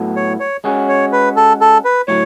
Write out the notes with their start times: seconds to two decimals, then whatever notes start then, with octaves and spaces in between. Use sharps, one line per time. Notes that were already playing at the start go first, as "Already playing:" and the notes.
Already playing: A2 F#3 B3 E4 A4
0.16 C#5
0.40 C#5
0.64 G#3 C#4 F#4
0.89 C#5
1.12 B4
1.36 A4
1.61 A4
1.85 B4
2.08 A2 F#3 C#5